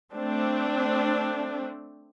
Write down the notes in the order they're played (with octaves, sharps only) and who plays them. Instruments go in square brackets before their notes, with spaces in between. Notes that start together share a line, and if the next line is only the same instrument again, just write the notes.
[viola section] A3 C4 D4